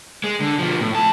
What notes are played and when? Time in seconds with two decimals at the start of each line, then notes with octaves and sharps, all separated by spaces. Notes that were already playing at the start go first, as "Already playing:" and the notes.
0.24 G#3
0.40 D3
0.58 B2 F3
0.81 A2
0.94 F2 A5